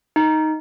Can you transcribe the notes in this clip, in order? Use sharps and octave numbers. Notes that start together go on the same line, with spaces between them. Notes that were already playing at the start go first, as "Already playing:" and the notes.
D#4